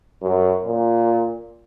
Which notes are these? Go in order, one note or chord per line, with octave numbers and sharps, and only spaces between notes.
F#2
A#2